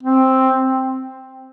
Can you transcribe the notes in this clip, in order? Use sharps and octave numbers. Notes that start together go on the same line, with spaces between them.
C4